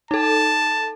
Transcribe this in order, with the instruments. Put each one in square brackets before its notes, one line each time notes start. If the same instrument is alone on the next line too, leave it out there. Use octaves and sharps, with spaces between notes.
[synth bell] D#4 A4 [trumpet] A5